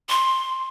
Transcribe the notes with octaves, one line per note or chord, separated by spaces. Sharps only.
C6